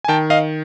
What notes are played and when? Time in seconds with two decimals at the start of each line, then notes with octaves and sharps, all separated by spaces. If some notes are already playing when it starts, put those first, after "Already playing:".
0.04 G#5
0.08 D#3 G5 A5
0.30 D#5 F5